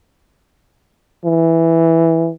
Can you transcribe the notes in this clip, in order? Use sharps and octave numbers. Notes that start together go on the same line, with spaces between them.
E3